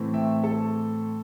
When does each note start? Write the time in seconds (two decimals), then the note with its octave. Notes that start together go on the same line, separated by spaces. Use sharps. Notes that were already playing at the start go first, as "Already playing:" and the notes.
Already playing: A2 E3 A3 C4
0.14 E5 G5
0.44 A4